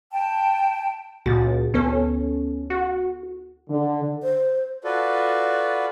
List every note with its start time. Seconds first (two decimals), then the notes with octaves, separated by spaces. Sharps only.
0.11 G5 A5
1.26 C#2 A#2 F#4 A6
1.74 D2 B3 C#4 A4
2.70 F#4
3.70 D3
4.23 C5
4.84 F4 F#4 A4 B4 D5